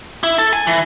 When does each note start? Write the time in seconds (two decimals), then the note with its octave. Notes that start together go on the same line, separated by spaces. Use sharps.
0.23 E4
0.38 A4
0.53 G#5
0.67 E3